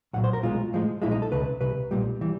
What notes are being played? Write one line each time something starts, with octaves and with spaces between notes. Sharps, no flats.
B1 A#2 F#3 F#5
C5
A#4
B1 B2 G#3 F4
A2 F3 G#3
B1 A#2 F3 G#3 E4
D#4
A4
C#2 C3 B4
C2 C3 B4
B1 A#2 G3
E3 G3